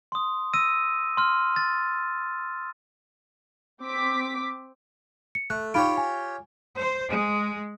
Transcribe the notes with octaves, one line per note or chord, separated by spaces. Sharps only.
C6 D#6
E6 A#6 D#7
C6 F6
A6
C4 D6 B6
C#7
A3 F#6
D#4 F4 G4 C#5 B5 D7
G#5
C5
G#3